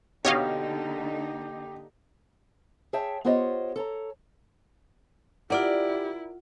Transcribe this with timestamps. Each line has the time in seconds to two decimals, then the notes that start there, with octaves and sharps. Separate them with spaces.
0.25 B2 D3 A#3 D#4 G4 C#5 D#5 F5
2.93 G#4 C#5 E5 G5 A5
3.25 B3 F4 G4 C5 C#5 D#5
3.76 A4 C#5 A#5
5.50 E4 F4 G4 A#4 D5 F#5